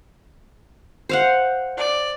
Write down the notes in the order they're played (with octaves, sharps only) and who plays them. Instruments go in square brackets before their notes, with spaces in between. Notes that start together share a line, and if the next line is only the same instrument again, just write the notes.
[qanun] C5 F5 F#5
[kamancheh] D5